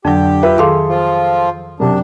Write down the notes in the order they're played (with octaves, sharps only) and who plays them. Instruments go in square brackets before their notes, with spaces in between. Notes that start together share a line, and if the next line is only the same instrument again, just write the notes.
[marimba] F2 F#3 [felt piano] D3 [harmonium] G4
[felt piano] F4 B4 E5
[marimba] D#3 F5 D6 [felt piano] G#4 A4 C6
[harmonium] F3 F4
[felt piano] F#2 C3 [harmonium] D4